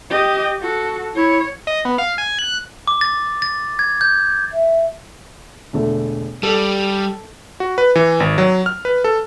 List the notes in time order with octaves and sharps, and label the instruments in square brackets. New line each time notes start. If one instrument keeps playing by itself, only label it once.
[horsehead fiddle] G4 D#5
F#4 A4
[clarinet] E4 [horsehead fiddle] C#5
[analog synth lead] D#5
B3
F5
G#5
F#6
[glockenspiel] D6
A6
A6
G#6
G6
[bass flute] E5
[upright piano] E1 D3 A3
[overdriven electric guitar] G3 [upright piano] A4
[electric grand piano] F#4
B4
E3
G#1
F#3
F6
B4
A4